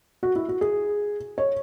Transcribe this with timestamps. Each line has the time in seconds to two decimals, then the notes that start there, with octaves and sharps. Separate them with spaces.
0.23 F#4
0.36 E4
0.49 F#4
0.61 G#4
1.38 C#5